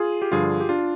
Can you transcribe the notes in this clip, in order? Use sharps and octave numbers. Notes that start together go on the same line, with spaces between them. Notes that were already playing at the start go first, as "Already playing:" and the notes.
Already playing: F4 G#4
G4
G2 D3 F3 F4 G#4
G4
D4 F4